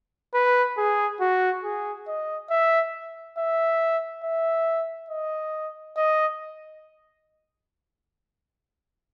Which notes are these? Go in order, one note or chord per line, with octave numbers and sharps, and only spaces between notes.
B4
G#4
F#4
G#4
D#5
E5
E5
E5
D#5
D#5